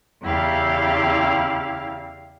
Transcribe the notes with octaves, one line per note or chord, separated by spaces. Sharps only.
E2 C#3 E4 G4 F5